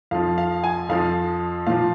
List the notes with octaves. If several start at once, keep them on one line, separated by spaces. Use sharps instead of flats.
F2 F3 F5
F5
G#5
F2 F3 F5
A#2 F3 F5